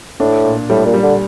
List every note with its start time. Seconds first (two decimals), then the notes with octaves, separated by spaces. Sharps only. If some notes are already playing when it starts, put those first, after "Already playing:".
0.19 A2 D4
0.44 A#2
0.70 A2 G3
0.86 A#2
0.94 G3
1.03 D3